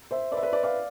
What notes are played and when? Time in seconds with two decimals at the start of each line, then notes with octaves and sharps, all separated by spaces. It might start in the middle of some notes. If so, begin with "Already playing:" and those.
0.11 C5 E5
0.32 B4 D5
0.37 E5
0.43 B4 D5
0.53 B4 D5
0.63 D5 F5